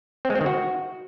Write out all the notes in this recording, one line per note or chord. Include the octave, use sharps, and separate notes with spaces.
C4
G#3
C4
D#3
F#4